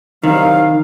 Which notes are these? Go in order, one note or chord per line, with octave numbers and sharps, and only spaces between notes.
C2 D#3 F#3 F5